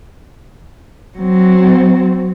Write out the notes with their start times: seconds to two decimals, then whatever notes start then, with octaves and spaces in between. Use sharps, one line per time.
1.18 F#3 C4